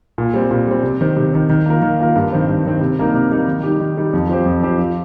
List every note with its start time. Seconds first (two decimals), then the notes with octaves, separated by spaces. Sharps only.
0.18 A#2
0.34 G3 C4
0.51 A#2
0.67 G3 C4
0.83 C3
1.01 D#3 C4
1.17 C3
1.33 D#3 C4
1.49 D#3
1.66 A#3 F4 A#4
1.82 D#3
2.00 A#3 F4 A#4
2.15 G2
2.33 D#3 C4
2.49 G2
2.66 D#3 C4
2.81 C3
2.98 G3 A#3 D#4 A#4
3.14 C3
3.31 G3 A#3 D#4 A#4
3.47 D#3
3.63 G3 D#4 G4
3.80 D#3
3.97 G3 D#4 G4
4.13 F2
4.29 F3 C4 G4 C5
4.46 F2
4.63 F3 C4 G4 C5
4.79 F3